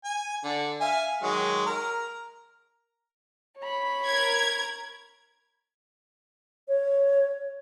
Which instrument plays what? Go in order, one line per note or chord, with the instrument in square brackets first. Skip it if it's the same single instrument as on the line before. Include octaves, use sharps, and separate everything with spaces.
[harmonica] G#5
D3
E5 F5 G#5
D#3 F#3 G#3
A#4 A#5
[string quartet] C#5 B5
[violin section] A#4 G#6
[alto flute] C#5